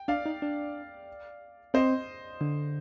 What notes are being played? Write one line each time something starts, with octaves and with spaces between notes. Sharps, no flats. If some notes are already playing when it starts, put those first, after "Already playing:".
Already playing: G5
D4 D5 F5
D#4
D4
C4 C5 D#5
D3